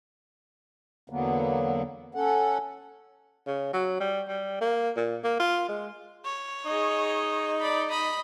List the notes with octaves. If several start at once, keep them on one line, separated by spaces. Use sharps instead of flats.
E2 D3 F#3 A#3 B3
C#4 A4 F#5
C#3
F#3
G3
G3
A#3
A#2
A#3
F4
G#3
C#5
D#4 G#4 D#5
D5 B5
D#5 B5